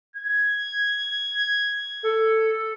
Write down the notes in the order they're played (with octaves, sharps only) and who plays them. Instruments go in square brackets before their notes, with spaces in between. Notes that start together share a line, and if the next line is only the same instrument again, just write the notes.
[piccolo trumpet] G#6
[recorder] A4